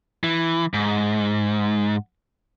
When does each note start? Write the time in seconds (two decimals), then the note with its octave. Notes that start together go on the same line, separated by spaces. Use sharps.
0.24 E3
0.74 G#2